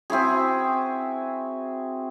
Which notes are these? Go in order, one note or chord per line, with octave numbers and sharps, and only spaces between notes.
C4 E4 F#4 G#4